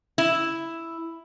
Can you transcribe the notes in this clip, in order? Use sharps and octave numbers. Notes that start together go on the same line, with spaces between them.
E4